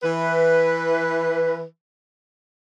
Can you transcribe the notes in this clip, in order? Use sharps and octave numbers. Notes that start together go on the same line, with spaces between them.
E3 B4